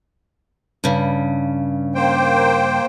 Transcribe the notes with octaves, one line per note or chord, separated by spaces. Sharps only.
G2 C#3
A#3 C5 G5